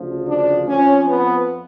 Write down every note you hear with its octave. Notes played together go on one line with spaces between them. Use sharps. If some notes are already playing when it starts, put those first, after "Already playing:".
Already playing: D2 C#3 F3
D4
F2 F3 C#4
B3